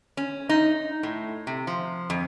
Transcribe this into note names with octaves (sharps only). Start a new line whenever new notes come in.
C#4
D#4
A2
C3
F3
F2